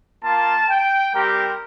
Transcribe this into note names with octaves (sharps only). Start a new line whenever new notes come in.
A#3 F4 A5
G5
G3 C4 G4 A#4